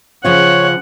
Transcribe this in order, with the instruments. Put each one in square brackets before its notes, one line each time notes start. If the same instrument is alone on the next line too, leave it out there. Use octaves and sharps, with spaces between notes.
[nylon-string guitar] C#3 F3 F4 [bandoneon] C#5 [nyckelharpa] F#5